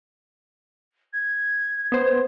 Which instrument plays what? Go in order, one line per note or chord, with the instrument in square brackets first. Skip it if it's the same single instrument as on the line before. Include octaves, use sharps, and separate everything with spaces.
[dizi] G#6
[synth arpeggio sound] B3 C5